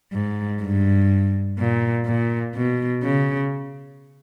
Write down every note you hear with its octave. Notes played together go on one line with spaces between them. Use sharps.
G#2
G2
A#2
A#2
B2
C#3